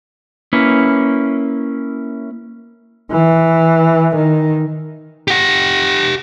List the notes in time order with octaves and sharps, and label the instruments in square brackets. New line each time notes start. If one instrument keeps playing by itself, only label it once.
[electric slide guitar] A#3 C#4 E4 B4
[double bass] E3
D#3
[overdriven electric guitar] G4 F#5